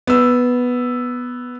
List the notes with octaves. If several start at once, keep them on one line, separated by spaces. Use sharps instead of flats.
B3 E6